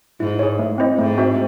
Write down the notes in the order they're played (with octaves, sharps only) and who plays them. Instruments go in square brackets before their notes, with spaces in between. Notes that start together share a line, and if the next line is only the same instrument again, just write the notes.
[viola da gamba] G#2 [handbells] E4
[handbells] G#4 C#5
A3
C4 E4 C5 D#5
[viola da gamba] G#2 [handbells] A3
[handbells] C4 F#4 C5 E5